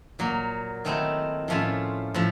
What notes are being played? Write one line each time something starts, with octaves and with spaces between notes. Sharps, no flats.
A#2 F#3 A#3
D#3 F#3 A3 C4 E4
A2 F3 A3 C#4 F4
A2 F3